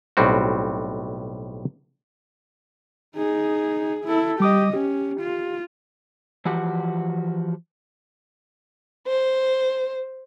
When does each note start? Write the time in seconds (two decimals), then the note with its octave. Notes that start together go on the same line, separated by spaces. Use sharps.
0.17 B1 A2 G3 C4 F#4
3.16 D#4 G#4
4.05 E4 A4
4.40 G3 G4 D#5 D6 D#6
4.74 C#4 G4
5.21 F4
6.45 E3 F3 F#4 G4
9.07 C5